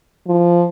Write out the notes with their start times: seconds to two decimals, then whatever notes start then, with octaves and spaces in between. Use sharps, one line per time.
0.28 F3